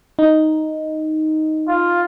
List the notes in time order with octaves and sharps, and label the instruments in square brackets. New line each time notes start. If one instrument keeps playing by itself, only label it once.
[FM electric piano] D#4
[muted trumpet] F4